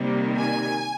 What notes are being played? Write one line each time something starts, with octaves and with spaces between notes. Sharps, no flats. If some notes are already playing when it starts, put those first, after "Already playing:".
Already playing: C3 D#3 G3 A#3
G#5